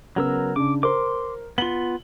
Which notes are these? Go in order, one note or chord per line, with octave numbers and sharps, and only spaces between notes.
C#3 F#3 B3 A#4 E6
C#3 D4 D6
A#4 C5 C6 D6
B3 F4 F#7 G7